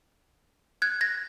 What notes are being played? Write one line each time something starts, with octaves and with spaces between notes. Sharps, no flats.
F#6 G#6
G#6 A#6